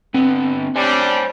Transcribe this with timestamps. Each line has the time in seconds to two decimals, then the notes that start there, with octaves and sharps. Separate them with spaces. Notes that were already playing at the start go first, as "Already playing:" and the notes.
0.14 D3 B3 C4 B4
0.76 G3 D4 C5 C#5 G#5